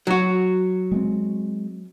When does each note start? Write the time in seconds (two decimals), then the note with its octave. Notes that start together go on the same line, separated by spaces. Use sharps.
0.07 F#3 F#4
0.92 G#3 A3 C4